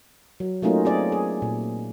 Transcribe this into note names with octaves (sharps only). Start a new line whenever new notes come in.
F#3
F#3 A3 A#3 C#4 D#4 F4
C4 G#4 D5
G#4
A#2